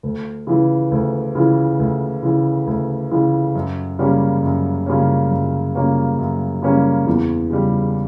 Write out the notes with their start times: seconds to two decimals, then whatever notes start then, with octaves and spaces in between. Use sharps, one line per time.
0.03 D2
0.47 C#3 E3
0.91 D2
1.35 C#3 E3
1.80 D2
2.23 C#3 E3
2.67 D2
3.12 C#3 E3
3.55 F#2
3.99 C#3 G3 A#3 C#4
4.43 F#2
4.86 C#3 G3 A#3 C#4
5.30 F#2
5.75 C#3 G3 A#3 C#4
6.19 F#2
6.62 C#3 G3 A#3 C#4
7.07 E2
7.50 C#3 G3